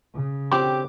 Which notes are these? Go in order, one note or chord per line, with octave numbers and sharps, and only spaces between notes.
C#3
C4 G4 D6